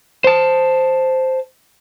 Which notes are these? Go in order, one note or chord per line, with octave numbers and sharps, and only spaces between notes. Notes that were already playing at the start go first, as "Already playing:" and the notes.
C5 A5